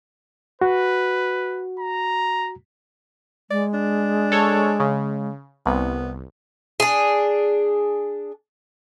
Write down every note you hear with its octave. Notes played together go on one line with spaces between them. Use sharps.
F#4 B4
A#5
G#3 D5
D4
A4 C#5
C#3
C2 B3
D4 G#4